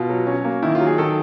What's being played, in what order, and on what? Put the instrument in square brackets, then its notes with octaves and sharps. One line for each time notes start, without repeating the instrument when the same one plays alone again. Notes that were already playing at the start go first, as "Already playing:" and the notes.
Already playing: [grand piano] B2 F4
F#3
C#4
A#3
D#3 E4
F4
F#3
G#4
D#3 A4